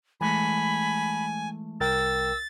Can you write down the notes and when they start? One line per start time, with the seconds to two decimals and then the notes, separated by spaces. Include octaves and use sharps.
0.21 E3 G#3 A3 G#5 B5
1.80 C2 A#4 G5 E6 A6